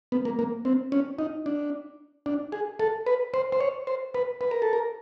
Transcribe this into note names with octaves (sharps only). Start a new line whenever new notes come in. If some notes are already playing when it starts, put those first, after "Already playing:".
B3
A#3
A#3
C4
C#4
D#4
D4
D4
G#4
A4
B4
C5
C5
C#5
C5
B4
B4
A#4
A4
A#4